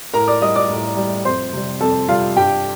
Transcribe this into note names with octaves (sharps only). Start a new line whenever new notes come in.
A2 A#4 A#5
D5 D6
G3 D#5 D#6
D5 D6
A2
G3
F2 C5 C6
C3 G3
F2 A4 A5
C3 G3 F4 F5
G2 G4 G5